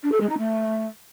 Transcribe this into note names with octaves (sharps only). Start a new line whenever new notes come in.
D4
A4
G#3
D#4
A3